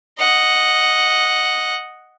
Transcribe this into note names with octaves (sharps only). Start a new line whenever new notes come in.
D#5 F#5